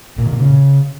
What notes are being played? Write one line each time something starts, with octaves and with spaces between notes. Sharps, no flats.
A#2
D#3
A#2
C#3